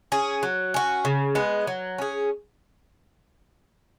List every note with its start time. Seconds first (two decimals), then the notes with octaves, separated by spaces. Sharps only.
0.12 C#4 G#4
0.43 F#3
0.74 C#4 F#4
1.05 C#3
1.35 G#3 B3
1.67 F#3
1.98 C#4 G#4